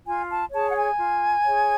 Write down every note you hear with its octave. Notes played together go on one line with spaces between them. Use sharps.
F4 G#5
A5
G#4 C#5 A5
F#5
G#5
F4
G#4 C#5